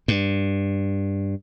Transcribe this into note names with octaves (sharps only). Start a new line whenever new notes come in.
G2